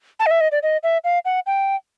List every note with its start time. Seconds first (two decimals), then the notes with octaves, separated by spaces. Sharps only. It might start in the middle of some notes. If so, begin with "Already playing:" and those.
0.19 A5
0.26 D#5
0.31 E5
0.41 D#5
0.52 D5
0.63 D#5
0.83 E5
1.04 F5
1.25 F#5
1.46 G5